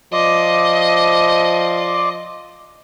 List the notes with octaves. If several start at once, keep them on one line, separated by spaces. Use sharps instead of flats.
F3 D5 D#5 C6 D6